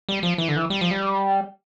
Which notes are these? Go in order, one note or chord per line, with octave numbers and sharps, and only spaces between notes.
G3
F3
E3
D3
E3
G3
F3
G3